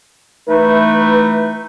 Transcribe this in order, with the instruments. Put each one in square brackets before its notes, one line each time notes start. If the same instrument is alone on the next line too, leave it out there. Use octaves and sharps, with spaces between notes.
[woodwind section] E3 A3 D#4 [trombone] B4